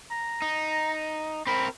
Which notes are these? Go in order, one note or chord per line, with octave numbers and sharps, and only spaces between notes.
A#5
D#4
C4 A#4 B5